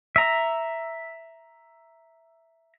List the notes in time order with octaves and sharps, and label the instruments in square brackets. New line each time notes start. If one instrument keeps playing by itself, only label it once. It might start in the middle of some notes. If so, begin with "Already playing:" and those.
[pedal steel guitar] E5 A#5